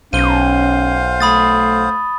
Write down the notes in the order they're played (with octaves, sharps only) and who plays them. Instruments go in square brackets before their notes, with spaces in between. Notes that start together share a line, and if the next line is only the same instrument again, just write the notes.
[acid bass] B1 [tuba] C#4 [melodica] C5 F5 [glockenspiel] D#7 G7
[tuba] A3 [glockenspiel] B5 D#6 A6